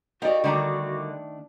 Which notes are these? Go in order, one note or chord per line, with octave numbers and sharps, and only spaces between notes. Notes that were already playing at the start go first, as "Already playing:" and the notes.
D#4 F#4 G4 A#4 D5 F5
D3 D#3 G3 A3 D4 A#5